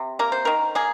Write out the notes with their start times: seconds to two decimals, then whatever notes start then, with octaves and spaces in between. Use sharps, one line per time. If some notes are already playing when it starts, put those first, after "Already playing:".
Already playing: C3
0.19 A#3 A#4
0.32 C5
0.45 D#3 A#4
0.75 A#3 G#4